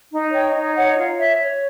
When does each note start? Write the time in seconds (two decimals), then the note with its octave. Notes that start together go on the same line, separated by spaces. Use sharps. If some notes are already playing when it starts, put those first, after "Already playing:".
0.11 D#4
0.32 C#5 G5
0.55 D#4
0.76 C#5 F#5
0.97 F4
1.18 C#5 E5
1.38 C#5